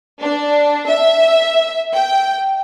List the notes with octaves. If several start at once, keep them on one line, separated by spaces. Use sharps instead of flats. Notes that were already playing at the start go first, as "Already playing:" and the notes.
D4
E5
G5